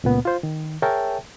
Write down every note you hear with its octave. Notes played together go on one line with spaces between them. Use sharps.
C#2 A#2 B3
F4 C5
D#3
G#4 A#4 C#5 E5 G5 A5